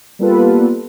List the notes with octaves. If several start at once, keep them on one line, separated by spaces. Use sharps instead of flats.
G3 A#3 B3 F4 A4 B4